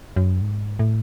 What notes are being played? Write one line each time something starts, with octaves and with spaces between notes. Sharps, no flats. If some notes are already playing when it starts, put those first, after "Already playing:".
F#2
G#2
A2